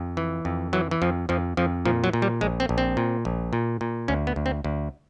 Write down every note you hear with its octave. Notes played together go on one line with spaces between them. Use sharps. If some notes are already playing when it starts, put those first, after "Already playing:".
Already playing: F2
E3
F2
E3 F#3
E3
F2 F3
F2 F3
F2 F3
A#2 F3
F#3
A#2
G3
A#1 G#3
C4
A#1
C4
A#2
A#1
A#2
A#2
D2 C#4
B3
D2
C4
D2